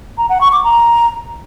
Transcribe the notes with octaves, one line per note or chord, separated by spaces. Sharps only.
A#5
F#5
C#6
D6
A#5